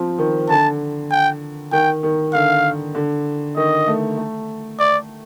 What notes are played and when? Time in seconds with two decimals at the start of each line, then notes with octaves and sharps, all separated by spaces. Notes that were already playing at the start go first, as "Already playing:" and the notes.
Already playing: F3 C4
0.18 D#3
0.49 D3 A5
1.11 G5
1.72 D#3 G5
2.03 D#3
2.33 D3 F5
2.95 D3
3.56 D#3 D#5
3.87 A3
4.17 A3
4.79 D5